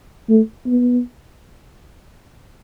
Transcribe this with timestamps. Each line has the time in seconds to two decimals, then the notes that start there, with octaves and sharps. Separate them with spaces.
0.29 A3
0.66 B3